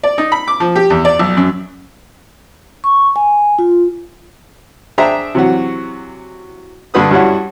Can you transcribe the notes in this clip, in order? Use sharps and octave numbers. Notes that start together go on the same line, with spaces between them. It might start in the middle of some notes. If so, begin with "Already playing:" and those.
D5
D#4
B5
D6
F3
G4
E2
D5
B1
F#2
C#6
G#5
F4
D4 G#4 C5 E5 G5 A#5
C3 E3 F#3 F#4
G2 D3 B4 D#6
G2 G3 C#4 E4 F#4 F#5